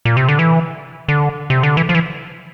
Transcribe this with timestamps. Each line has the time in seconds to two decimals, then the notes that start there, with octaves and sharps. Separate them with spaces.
0.05 A#2
0.17 C3
0.28 D3
0.39 E3
1.08 D3
1.50 C3
1.63 D3
1.77 E3
1.89 F3
1.95 E3